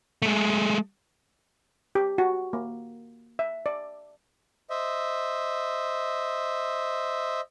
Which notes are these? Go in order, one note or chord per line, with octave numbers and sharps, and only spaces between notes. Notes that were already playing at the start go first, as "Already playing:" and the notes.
G#3 A3
G4
F#4
A#3
E5
D5
C5 D#5 E5